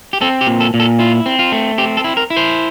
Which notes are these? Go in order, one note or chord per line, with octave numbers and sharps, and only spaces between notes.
G4
C4 A4
G4
A#2
A4
A#2
A4
E4 F4
C4
F4
A3
C4 G4
A4
E4
A#4
E4
C5